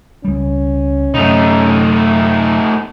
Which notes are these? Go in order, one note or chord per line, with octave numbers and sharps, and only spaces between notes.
C#2 G3 C#4
F#2 C3 A3 D#4